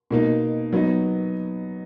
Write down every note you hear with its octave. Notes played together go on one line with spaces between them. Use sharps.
B2 A#3 D#4
F#3 B3 D#4